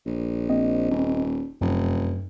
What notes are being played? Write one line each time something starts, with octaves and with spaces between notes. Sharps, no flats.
A#1
A#3 C4 D#5
D#1
F1 F#2